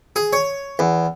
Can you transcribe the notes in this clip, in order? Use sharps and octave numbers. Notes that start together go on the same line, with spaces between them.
G#4
C#5
E2